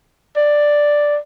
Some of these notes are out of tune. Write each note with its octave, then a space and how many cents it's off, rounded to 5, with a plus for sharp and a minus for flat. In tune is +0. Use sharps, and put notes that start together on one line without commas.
D5 +5